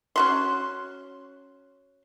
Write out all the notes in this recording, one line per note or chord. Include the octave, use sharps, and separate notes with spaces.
C#4 F#4 C6